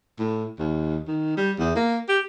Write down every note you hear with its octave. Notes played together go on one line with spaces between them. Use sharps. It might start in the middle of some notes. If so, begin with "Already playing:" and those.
A2
D#2
D#3
G3
E2
A#3
G4